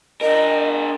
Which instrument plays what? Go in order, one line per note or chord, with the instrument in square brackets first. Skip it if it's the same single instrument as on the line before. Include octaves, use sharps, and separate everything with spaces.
[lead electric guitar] D4 A#4 [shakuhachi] D#5